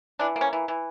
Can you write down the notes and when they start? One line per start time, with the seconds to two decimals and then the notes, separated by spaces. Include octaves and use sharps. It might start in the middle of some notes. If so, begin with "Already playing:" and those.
0.19 E3 D4
0.36 A#3
0.41 C#4
0.53 E3
0.68 E3